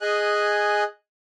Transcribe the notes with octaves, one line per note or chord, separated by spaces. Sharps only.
G#4 D#5 G#5 F#6